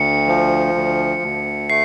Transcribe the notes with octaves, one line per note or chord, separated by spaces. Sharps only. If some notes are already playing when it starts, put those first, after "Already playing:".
Already playing: D2 C#7
F3
D2
D2
A3 C7